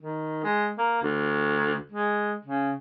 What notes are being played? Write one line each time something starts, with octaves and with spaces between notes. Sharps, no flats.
D#3
G#3
A#3
D2
G#3
C#3